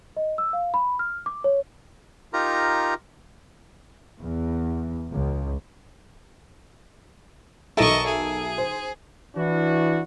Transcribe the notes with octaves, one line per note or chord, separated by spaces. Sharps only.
D#5
E6
F5
B5
F6
D6
C#5
D#4 F4 G4 A#4 A#5
E2
C#2
B1 A4 A#4 D#5 E5 A5 C#6
G#4
C5
E3 D4 E4 F#4